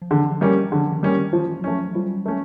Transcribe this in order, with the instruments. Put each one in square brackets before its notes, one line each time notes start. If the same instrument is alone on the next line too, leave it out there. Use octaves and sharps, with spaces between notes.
[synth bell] F3
[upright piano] D3 [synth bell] E3
[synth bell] F3
[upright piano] G3 A#3 C#4
[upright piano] D3 [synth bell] F3
[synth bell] D#3
[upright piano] G3 A#3 C#4
[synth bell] D#3
[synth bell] E3 [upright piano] F3
[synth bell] F#3
[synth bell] F3 [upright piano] A3 C#4
[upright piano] F3 [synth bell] G3
[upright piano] A3 C#4